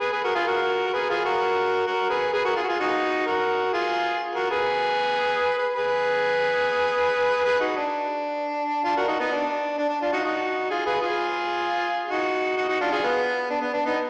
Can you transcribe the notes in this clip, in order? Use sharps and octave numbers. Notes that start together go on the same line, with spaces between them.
G#4 B4
G#4 B4
F#4 A#4
F4 G#4
F#4 A#4
A#4
G#4 B4
F4 G#4
F#4 A#4
F#4 A#4
G#4 B4
G#4 B4
F#4 A#4
F4 G#4
F#4
F4 G#4
D#4 F#4
F#4 A#4
F4 G#4
F#4 A#4
G#4 B4
B4
G#4 B4
G#4 B4
D#4 F#4
D4
D4 F4
F#4 A#4
D#4 F#4
B3 D#4
D4
D4
D4
D4 F4
D#4 F#4
D#4 F#4
F4 G#4
G#4 B4
F4 G#4
D#4 F#4
D#4 F#4
D#4 F#4
D4 F4
F4 G#4
B3
D4
B3
D4
B3 D#4